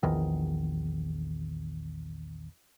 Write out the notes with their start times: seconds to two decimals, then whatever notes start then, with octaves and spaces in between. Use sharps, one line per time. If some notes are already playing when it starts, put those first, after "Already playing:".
0.03 A#1 E2 D#3